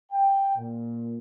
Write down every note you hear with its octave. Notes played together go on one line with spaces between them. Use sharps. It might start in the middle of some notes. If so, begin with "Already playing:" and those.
G5
A#2